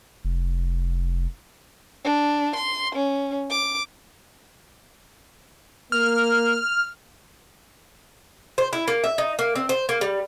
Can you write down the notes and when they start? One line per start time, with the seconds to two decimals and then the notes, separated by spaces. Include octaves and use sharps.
0.25 F1
2.04 D4
2.55 C6
2.95 C#4
3.50 D6
5.92 A#3 F6
8.58 C5
8.73 E4
8.88 A#3
9.04 E5
9.18 D#4
9.39 A#3
9.56 C4
9.69 C5
9.89 A#3
10.01 G3